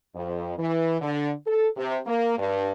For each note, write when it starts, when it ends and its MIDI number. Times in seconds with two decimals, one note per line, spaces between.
0.15 0.55 41
0.58 0.97 52
1.01 1.30 50
1.46 1.67 69
1.76 1.97 48
2.06 2.35 58
2.38 2.71 43